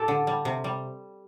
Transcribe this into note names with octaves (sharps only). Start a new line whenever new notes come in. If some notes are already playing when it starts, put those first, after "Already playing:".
Already playing: A2 G4 A4
D3
G3
C3
G3